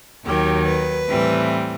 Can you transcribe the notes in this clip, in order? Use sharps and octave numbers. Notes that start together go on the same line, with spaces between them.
D#2 D#3 F#3 G4
B4
A2 E3 G3 C4